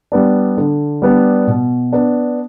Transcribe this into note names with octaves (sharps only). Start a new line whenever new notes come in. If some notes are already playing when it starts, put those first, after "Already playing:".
G3 B3 D4
D3
G3 B3 D4
B2
B3 D4